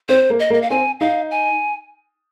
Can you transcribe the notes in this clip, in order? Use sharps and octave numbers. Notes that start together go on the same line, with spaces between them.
C4 C5
A#3
D#5
A#3
D#5
F5
C4 G#5
D#4 F5
G#5